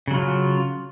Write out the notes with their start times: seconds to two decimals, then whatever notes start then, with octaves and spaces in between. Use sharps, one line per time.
0.08 C#3
0.11 F#3
0.14 F4